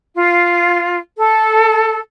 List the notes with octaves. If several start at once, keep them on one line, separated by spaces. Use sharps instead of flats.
F4
A4